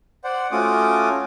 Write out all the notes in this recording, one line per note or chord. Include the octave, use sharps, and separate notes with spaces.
C5 D5 F#5
A3 C#4 F4 F#4 D6 D#6